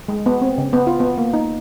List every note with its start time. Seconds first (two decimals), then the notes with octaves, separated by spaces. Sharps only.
0.08 G#3
0.26 B3
0.41 C4
0.58 C#3
0.73 B3
0.87 F4
1.00 B3
1.18 A#3
1.33 D#4